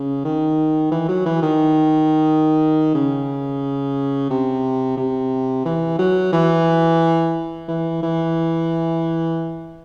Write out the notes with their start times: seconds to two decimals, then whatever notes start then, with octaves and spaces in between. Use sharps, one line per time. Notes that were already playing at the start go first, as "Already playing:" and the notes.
Already playing: C#3
0.25 D#3
0.92 E3
1.09 F#3
1.26 E3
1.42 D#3
2.95 C#3
4.30 C3
4.97 C3
5.65 E3
5.98 F#3
6.33 E3
7.68 E3
8.02 E3